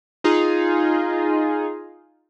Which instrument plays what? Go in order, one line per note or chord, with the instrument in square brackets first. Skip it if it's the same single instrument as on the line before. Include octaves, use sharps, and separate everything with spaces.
[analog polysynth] D#4 F4 G#4